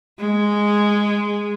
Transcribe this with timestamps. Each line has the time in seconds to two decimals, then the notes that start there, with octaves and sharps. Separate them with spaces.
0.19 G#3